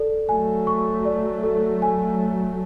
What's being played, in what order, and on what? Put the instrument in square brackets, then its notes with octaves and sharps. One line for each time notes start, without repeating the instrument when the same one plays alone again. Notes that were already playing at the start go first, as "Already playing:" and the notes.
Already playing: [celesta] A4 D5
[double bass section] F#3 A3 [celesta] G#5
[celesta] C#6
D5
A4
G#5